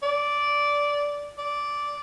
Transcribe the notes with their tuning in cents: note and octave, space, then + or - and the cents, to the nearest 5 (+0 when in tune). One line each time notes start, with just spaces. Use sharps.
D5 -10
D5 -10